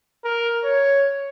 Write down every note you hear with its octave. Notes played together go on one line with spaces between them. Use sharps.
A#4
C#5